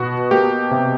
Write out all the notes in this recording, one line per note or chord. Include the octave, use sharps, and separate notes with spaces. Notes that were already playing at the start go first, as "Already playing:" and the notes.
Already playing: B2 B3 F#4
A#3 G4
C3